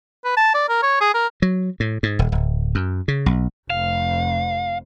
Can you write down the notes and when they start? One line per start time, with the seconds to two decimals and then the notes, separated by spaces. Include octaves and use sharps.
0.25 B4
0.37 A5
0.54 D5
0.69 A#4
0.83 C#5
1.01 G#4
1.14 A#4
1.42 F#3
1.80 A2
2.03 G#2
2.19 D#1
2.32 D1
2.75 F#2
3.08 C#3
3.26 B1
3.70 F1 F2 F5